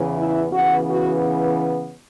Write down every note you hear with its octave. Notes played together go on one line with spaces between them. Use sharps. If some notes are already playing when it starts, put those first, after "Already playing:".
Already playing: E2 C#3 E3
E4
C#3 E3 B3 F#4
F#4